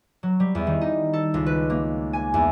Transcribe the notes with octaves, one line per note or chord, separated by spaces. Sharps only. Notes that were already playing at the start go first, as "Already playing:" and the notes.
F#3
G3
E2
D#3
D#4
A4
C#2
B4
A#3
G#5
E2